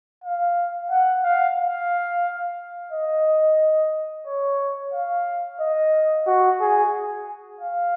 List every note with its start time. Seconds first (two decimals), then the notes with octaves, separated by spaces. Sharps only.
0.24 F5
0.90 F#5
1.23 F5
1.58 F5
2.92 D#5
4.26 C#5
4.93 F5
5.60 D#5
6.26 F#4
6.60 G#4
7.61 F5